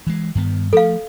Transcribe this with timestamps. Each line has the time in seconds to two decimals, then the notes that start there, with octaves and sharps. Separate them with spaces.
0.07 E3 G#3
0.35 G2 D#3 B3
0.73 F3 A3 A4 F5